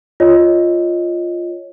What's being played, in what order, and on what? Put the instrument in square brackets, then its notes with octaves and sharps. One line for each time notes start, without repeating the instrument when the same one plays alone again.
[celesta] F4 C#5 D#5